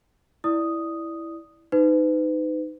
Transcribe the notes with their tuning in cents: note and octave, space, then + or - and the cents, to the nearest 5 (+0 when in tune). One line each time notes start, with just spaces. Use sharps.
E4 +0 D5 +0 D#6 +0
D#4 -5 B4 +35